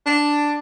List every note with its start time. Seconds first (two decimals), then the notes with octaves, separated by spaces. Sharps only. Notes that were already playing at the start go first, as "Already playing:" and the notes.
0.07 D4